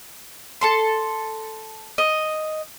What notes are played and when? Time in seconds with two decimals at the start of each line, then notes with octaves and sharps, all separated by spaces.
0.61 A4 A5 C6
1.98 D#5